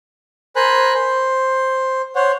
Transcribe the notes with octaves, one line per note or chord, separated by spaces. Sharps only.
A#4 C5 G#5 B5 F#6
C5
C5 C#5 F#5